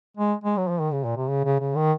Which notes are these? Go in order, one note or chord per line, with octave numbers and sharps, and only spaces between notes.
G#3
G#3
F#3
F3
D#3
C#3
A#2
C3
C#3
C#3
C#3
D#3